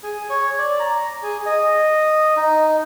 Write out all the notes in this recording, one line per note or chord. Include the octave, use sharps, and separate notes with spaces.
G#4
C#5
D5
A#5
G#4
D#5
D#4